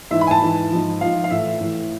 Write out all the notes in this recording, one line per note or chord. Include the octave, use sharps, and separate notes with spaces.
G#2 E3 E5
B5
G#5
A5
G#2 E3
G#2 F3
G#2 F3 F5
F5
A2 E3 E5
A2 E3